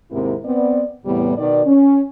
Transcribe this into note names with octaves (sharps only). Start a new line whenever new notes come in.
D#2 G#2 C3 C4 E4 A#4
B3 C4 D5
E2 A2 C3 G3 B3
B2 D#3 D5
C#4